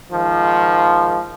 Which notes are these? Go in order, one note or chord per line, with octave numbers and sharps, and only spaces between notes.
G#2 D#3 F3